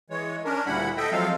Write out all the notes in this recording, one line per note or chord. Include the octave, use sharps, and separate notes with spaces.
E3 G#3 C#5
C#4 D4 A#4
D2 A#2 G3 E4 F#5 B5
A4 D#5 E5 G5
F3 F#3 G#3 C4 A4 F5